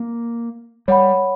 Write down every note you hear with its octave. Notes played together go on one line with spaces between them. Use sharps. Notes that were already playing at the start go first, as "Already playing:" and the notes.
Already playing: A#3
G3 C#5 F#5 B5